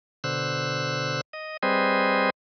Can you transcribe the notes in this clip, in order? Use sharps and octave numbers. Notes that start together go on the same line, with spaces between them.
B2 D3 C5 E6 F#6
D#5
G3 C4 G#4 B4 C5 D#5